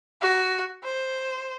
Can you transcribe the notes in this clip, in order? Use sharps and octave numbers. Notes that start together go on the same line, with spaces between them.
F#4
C5